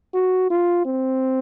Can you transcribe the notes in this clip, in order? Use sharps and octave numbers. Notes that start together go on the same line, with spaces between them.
F#4
F4
C4